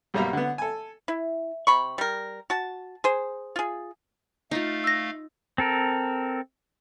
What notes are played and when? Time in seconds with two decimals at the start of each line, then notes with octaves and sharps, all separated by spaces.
0.14 B1 G2 G3 A#3 E5 A#5
0.33 D3 B3
0.58 A4 G#5
1.08 E4
1.67 C3 B5 C#6
1.98 G3 A#4
2.50 F#4 A5
3.04 G#4 C5
3.56 F4 G#4
4.51 A3 D#4 F4 F5
4.84 E6 A#6
5.58 C4 A4 A#4